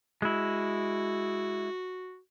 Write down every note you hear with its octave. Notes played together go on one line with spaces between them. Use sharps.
G#3 E4 F#4